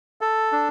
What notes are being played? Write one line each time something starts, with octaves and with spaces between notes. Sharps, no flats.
A4
D4